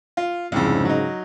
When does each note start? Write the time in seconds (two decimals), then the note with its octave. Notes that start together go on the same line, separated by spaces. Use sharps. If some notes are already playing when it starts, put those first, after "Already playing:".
0.17 F4
0.52 C2 F2 G#2 C#3
0.85 F#3 D#4